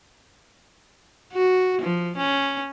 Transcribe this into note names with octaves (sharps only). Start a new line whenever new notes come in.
F#4
F3
C#4